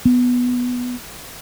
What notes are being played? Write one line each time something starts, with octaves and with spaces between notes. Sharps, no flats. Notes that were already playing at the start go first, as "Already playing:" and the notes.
B3